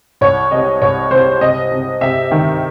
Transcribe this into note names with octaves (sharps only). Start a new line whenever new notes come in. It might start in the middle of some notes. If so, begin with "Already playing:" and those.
C2 C#5
C3 D#5
C2 C#5
C3 C5
C3 D#5
C3
C3 E5
D#3